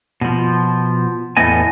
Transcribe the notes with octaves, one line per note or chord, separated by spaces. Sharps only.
B2 F3
E2 A2 A3 B3 D#5 G#5